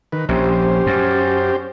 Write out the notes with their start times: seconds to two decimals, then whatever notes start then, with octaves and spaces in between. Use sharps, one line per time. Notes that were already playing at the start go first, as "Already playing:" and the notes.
0.12 D#3 B4
0.29 A#1 C#4 G4 C5
0.87 F#2